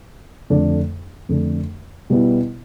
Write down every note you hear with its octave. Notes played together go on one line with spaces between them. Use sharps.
F2 D3 A3 D4
F2 D3 A3 D4
B2 G3 B3 E4